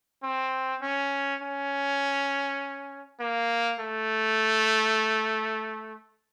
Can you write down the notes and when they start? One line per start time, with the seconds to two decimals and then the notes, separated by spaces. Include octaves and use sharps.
0.23 C4
0.82 C#4
1.42 C#4
3.20 A#3
3.80 A3